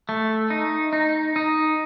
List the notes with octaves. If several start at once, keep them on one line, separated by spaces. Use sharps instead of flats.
A3
D#4
D#4
D#4